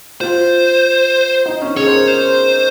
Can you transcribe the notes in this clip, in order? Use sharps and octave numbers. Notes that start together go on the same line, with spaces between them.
F4 C5
D#4
C#4
G#4 C#5
C5
A#4
C5